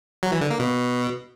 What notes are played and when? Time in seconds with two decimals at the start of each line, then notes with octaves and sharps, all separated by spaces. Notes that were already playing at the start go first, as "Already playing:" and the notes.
0.23 F#3
0.32 E3
0.41 D3
0.50 A#3
0.59 B2